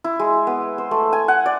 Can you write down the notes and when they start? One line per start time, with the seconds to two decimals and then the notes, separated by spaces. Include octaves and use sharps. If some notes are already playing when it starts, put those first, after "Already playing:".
0.04 E4
0.19 G#3
0.47 B3
0.78 C5
0.91 A3
1.13 G#5
1.28 F#5
1.46 D5